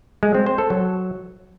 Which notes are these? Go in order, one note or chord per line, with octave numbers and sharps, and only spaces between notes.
G#3
C4
C5
A4
F#3